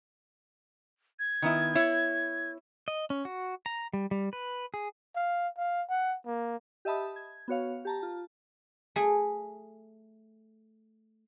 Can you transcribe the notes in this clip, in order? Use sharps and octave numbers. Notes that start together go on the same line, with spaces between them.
G#6
D#3 B3 E4
E4 C#5
D#5
C#4
F#4
A#5
G3
G3
B4
G#4
F5
F5
F#5
A#3
G4 D#5 E5 A5 B5 D#6
G#6
B3 F#4 C#5 F5
G4 A5 A#5
F4 A5
A3 G#4